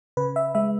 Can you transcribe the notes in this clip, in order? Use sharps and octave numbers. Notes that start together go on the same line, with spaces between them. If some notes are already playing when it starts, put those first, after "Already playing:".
C#3 B4
E5
G#3 E5